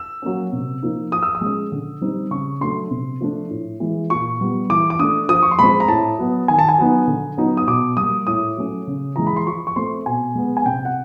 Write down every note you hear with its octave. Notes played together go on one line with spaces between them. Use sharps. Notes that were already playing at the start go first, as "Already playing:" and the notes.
Already playing: E6
F#3 A#3 C#4
C3
F3 A#3 D#4
F3 D#6
E6
D#6
G#3 C#4
D3
G3 C4 D#4
C#3 C#6
F#3 A3 D4 C6
C3
F3 A3 D4
A2
E3 G#3
A#2 C#6
G3 B3
E3 D6
D6
A3 D4 D#6
F3 D#6
C#6
C6
G#3 C4 B5
A#5
A2 A5
F#3 B3
D#3 G#5
A5
G#5
F#3 B3 D#4
D3
F#3 B3 D#4
D#6
B2 D6
G3 D#6
A#3
A2 D#6
F#3 A3 C#4
C#3
E3 G#3 A#5
B5
C6
F3 C#6
C#6
A3 C4 C6
B2 G#5
G#3 B3
G#5
C3 G5
F#5